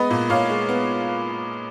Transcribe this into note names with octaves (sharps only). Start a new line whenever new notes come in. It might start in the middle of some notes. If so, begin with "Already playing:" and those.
Already playing: G#3 B3 B4 D#5
A#2
A#2 C#5 F5
G#3
B3